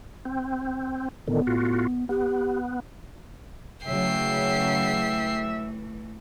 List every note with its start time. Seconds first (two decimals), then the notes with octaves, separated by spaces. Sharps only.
0.25 C4
1.28 A2 D3 D#3 B3
1.47 A2 F4 F#4
2.09 B3 G4
3.86 C#3 E3 F#3 A3 E5 G5 C7